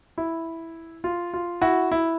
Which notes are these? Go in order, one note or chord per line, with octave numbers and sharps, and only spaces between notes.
E4
F4
F4
E4 F#4
E4